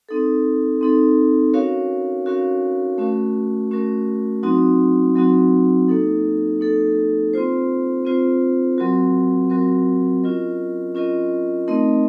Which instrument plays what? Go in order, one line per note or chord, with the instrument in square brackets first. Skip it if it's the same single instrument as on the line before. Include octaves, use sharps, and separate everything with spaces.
[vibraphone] C4 D#4 A4
C4 D#4 A4
C#4 F#4 A#4 C#5 F5
C#4 F#4 A#4 C#5 F5
A3 C#4 F#4 A#4
A3 C#4 F#4 A#4
F#3 C4 D#4 F#4
F#3 C4 D#4 F#4
A#3 D#4 A4
A#3 D#4 A4
C4 F4 C5
C4 F4 C5
F#3 C4 F#4 A#4
F#3 C4 F#4 A#4
C#4 F4 A#4 D#5
C#4 F4 A#4 D#5
A3 C4 D#4 A#4 D#5